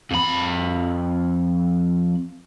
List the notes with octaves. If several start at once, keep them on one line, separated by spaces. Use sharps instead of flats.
F2 B5